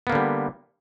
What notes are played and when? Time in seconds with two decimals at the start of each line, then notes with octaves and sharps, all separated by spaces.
0.07 B3
0.10 A#3
0.12 D3
0.15 G3